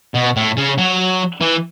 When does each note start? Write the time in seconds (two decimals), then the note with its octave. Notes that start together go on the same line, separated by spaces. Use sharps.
0.15 B2
0.36 A2
0.57 C#3
0.78 F#3
1.41 E3